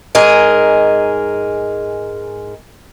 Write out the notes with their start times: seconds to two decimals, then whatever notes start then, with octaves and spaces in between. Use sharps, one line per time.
0.15 G#2 G#4 A#4 D#5